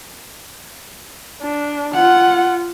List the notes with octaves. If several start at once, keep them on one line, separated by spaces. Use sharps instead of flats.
D4
F4 F#5